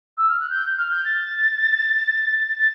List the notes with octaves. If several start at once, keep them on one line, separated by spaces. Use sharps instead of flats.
E6
F6
F#6
G6
F6
G6
A6
A6